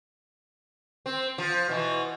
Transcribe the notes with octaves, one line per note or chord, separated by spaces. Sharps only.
C4
F3
B2 E3